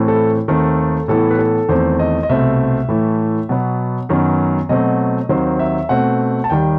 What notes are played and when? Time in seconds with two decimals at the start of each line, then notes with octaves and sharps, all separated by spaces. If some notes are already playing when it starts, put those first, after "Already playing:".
Already playing: A2 E3 A3 C4
0.08 A4
0.48 D#2 D#3 A3 C4 A4
1.08 A2 E3 B3 A4
1.31 B4
1.39 A4
1.69 E2 D#3 A3 C4 C5
1.99 D#5
2.23 D#5
2.29 C2 B2 A3 C4 E5
2.89 A2 E3 A3
3.49 B2 F#3 B3
4.09 F#2 D#3 F#3 B3
4.69 B2 F#3 A3 C4 D#5
5.29 D#2 D#3 F#3 C4 C5
5.59 E5
5.89 B2 A3 C4 F#5
6.44 A5
6.50 D#2 D#3 G3 G5